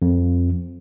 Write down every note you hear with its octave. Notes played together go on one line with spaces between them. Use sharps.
F2